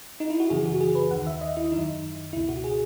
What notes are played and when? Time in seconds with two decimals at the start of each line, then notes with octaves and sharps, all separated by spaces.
0.20 D#4
0.30 E4
0.40 F#4
0.50 F#2 C#3 E3 G#4
0.65 F#4
0.80 G#4
0.95 B4
1.11 D#2 D#3 F#5
1.27 E5
1.41 D#5
1.57 E4
1.72 F#2 D#3 D#4
2.33 C#2 E4
2.37 B2
2.48 F#4
2.64 G#4